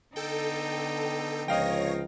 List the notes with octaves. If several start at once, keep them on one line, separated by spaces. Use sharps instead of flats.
D3 B3 D#4 A4 G5
C#2 F3 C#5 D#5 F5 G5 A#6